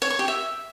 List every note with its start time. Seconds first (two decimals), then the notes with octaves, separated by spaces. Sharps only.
0.02 C#5
0.10 C#6
0.19 G4
0.28 E5